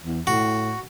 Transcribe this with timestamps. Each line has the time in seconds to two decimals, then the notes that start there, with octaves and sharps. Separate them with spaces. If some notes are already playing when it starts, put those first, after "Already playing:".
0.04 E2
0.27 A2 F#4